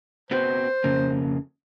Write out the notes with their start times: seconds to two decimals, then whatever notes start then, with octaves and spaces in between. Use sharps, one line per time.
0.31 B3 C4 F#4 C5
0.84 F2 C#3 A#3